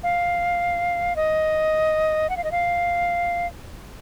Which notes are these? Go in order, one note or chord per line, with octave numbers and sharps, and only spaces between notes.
F5
D#5
F#5
F5
D#5
F5